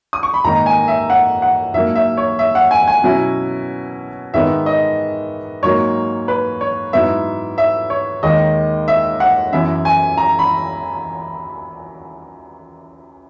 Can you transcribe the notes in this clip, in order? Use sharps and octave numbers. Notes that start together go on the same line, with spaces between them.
D#6
C#6
B5
G#2 D#3 A#3 D#4 A#5
G#5
E5
F#5
F#5
G#2 F#3 A#3 E5
E5
C#5
E5
F#5
G#5
G#5
B2 F#3 C#4 E4
G#2 D#3 G#3 B3 E5
D#5
G#2 F#3 A#3 C#5
B4
C#5
G#2 F#3 B3 E4 E5
E5
C#5
D#2 D#3 G#3 D#5
E5
F#5
F#2 E3 B3 E4 E5
G#5
A#5
B5